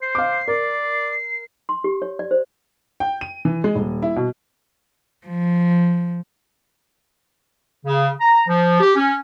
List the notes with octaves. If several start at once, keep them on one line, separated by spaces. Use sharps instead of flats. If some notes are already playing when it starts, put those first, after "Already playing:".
C5 C7
F5 D6
A#4 D5
C6
G4
C#5
D5
C5
G5
D#7
E3
G#3
D#1
E4
B2
F3
C#3
A#5
F3
G4
C#4